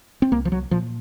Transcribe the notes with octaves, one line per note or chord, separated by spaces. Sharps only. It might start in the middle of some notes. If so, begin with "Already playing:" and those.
C4
C2 A#3
F3
F#3
A#2 F3